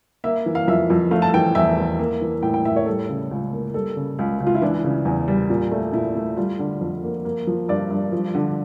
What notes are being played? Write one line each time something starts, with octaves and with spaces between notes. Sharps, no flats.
A#3 E5
E3
F5
F2 E5
F2
A3 F5
A5
E3 G5
E2 E5
E2
A#3
E3
A2 G5
G5
A2 E5
C#5
G3 A4
C#3
C#2
A#3
G3 A4
C#3
C#2
C#2
F4
E4
E3 D4
C#3
E2
G3
A#2
A3
A#2 E4
A3
G3 F4
D3
F2
A#3
A#3
F3
G2 D5
G2
F3
D3